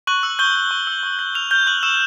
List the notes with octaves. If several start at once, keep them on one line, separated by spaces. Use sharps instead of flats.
C#6 F#6 F#7
E6
C#6 G6 G7
G6
C#6
E6
C#6
G6
F6 F7
F6 G6 G7
C#6 F#6 F#7
C#6 E6 E7